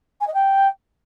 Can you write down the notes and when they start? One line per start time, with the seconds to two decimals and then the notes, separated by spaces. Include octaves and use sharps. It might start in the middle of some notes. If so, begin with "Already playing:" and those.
0.20 G#5
0.27 D#5
0.33 G5